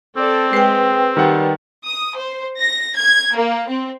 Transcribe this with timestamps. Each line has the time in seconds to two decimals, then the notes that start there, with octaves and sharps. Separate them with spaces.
0.17 C4 A4 D5
0.53 G#3 B4 G5 C7
1.17 D#3 G3 F#5
1.84 D#6
2.16 C5
2.57 A#6
2.94 G#6
3.35 A#3
3.68 C4